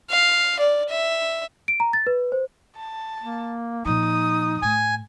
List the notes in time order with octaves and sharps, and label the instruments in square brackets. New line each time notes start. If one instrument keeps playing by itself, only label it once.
[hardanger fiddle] F5
D5
E5
[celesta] D7
A#5
A6
B4
C5
[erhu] A5
[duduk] A#3
[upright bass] A#2 F3 [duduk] D#4 [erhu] D#6
[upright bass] A2 [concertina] G#5